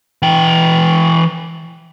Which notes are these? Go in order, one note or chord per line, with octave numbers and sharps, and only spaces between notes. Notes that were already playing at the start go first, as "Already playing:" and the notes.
E3 G5